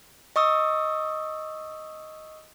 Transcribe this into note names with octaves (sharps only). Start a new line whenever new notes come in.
D#5 C#6 D#6 E6